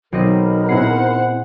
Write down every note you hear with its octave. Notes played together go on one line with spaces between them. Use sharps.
B1 C4 D#4 A#4 D#5 B5
A#2 B3 C4 E4 G#4 C5 F#5 C7